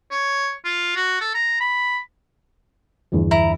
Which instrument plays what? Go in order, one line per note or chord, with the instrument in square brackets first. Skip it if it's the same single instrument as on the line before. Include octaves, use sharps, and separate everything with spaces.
[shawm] C#5
F4
F#4
A4
A#5
B5
[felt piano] G1 E2
[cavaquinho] E4 A#5